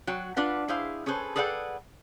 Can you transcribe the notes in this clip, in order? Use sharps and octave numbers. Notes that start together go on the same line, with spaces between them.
F#3 F#4 G5
D4 F4 B4 F#5
E4 G#4 C5 F5
C#4 G#4 A4 B4 C5
G#4 A4 B4 D5 F#5 G5